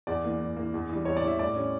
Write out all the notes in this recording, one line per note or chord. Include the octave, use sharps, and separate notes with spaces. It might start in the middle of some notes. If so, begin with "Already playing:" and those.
E2 D5
E3 A#3
E2
E3 A#3
E2
E3 G3
E2 C#5
D5
E3 G3 E5
A2 D5
G3 C#4